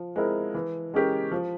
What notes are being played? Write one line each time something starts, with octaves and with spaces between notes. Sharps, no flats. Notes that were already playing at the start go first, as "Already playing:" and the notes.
Already playing: F3
G#3 C4 E4 A#4
E3
G#3 C#4 G4 A#4
F3